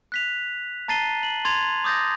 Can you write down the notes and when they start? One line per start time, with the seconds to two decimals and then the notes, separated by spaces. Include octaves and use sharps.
0.12 F#6 B6 F7
0.88 A5 A#5 A6 C7 D#7 G7
1.23 F#7
1.45 C6 G#6 A6 F7
1.84 D6 D#6 G6 A6 A#6